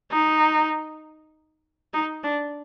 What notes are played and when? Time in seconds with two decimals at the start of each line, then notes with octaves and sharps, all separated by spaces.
0.12 D#4
1.94 D#4
2.24 D4